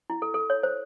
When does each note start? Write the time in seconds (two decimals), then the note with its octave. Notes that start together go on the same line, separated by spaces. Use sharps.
0.10 E4
0.22 A4
0.34 A4
0.50 C#5
0.63 C5